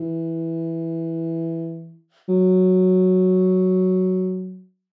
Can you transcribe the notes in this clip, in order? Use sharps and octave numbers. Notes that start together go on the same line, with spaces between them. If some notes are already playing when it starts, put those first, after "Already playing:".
Already playing: E3
F#3